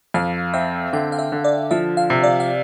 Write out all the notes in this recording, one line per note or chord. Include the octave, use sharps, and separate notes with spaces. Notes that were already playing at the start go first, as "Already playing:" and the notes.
F2 F5
C4 E5
D3 G5
F5
E5
D3
D5
F3 E5
F5
C3
D5
F5